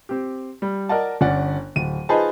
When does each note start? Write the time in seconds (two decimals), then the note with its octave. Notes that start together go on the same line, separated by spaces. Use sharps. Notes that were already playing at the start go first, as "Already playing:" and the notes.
0.09 C4 G4
0.62 G3
0.89 A#4 D5 D#5 F#5 A5
1.21 G1 C#4 D5 F#5
1.76 D1 D#7
2.09 D#4 F4 G#4 B4 C5 A5